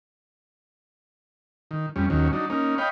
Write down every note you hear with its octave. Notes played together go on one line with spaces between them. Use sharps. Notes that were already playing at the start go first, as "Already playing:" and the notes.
D#3
F2 G3 C#4
D#2 D#3 F#3 C#4
F#3 D4 D#4
A#3 C#4 D#4
C#5 D#5 F5 G5 B5